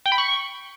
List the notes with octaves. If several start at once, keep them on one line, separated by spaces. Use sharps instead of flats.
G5
B5
C#6